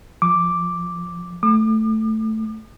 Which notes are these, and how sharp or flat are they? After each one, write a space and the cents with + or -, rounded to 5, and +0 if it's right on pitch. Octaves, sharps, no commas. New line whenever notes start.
F3 +0 D6 +0
A3 +0 D6 +45